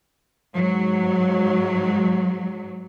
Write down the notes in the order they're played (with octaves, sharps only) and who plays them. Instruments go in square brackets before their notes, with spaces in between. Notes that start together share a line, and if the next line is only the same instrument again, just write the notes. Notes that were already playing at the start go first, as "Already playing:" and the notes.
[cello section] G#2 F#3